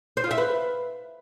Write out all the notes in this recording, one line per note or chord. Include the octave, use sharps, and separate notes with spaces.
C5
F4
E5
B4